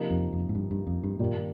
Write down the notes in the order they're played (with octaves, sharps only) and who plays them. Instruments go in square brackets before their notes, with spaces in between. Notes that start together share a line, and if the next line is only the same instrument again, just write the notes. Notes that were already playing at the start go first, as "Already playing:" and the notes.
Already playing: [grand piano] C3 F3 A#3 D#4
[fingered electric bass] F2
F2
G#2
G2
G2
F2
G2
[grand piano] G2 D#3 A#3 D4 G4 [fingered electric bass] A#2